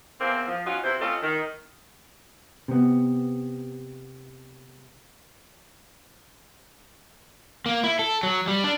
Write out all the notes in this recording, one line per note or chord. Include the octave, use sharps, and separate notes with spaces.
E2 A#3 C4
F3
C#4 D#4 F4 F#4
C3 E3 E4 C5
C4 C#4 F4 A4 D#5
D#3
C3 B3
A#3
E4
A4
F#3
G3
D4